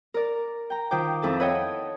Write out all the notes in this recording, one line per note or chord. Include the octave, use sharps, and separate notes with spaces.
A#4 D5
G5 A#5
D#3 F4 C5 G5 D6
F2 E4 A4 A5
B4 C#5 D#5 F#5 G5